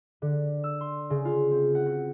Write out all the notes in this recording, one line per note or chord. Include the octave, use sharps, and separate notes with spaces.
D3
E6
C6
C#3
F4
C4
F#5
F#4